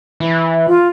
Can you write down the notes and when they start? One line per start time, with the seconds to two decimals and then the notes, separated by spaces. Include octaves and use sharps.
0.20 E3
0.67 F4